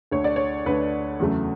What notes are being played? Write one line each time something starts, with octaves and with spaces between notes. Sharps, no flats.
D2 D3 A3 C#5
D5
C#5
D2 D3 A3 B4
E2 C#3 F#3 A3